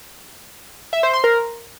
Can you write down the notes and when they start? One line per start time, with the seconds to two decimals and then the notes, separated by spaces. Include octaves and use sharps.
0.93 E5
1.03 C5
1.13 C6
1.24 A#4